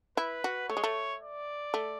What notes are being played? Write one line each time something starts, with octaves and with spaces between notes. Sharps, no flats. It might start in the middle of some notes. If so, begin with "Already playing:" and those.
E4 B4
F#4
A3 C#5
G#3
A3
D5
A3